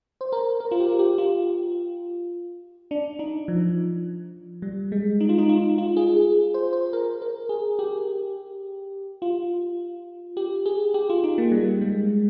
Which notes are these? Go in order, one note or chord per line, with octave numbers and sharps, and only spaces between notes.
C5
A#4
A#4
F4
G4
G4
F4
D4
D#4
F3
G3
G#3
D#4
F4
D#4
F4
F4
G#4
G#4
C5
C5
A#4
A#4
G#4
G4
F4
G4
G#4
G4
F4
D#4
A#3
G3
G#3